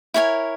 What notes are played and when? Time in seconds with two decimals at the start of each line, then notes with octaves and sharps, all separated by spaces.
0.14 E4 A#4 C#5 G#5